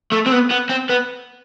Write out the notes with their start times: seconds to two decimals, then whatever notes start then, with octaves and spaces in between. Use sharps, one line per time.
0.12 A3
0.26 C4
0.32 B3
0.51 B3
0.70 C4
0.90 B3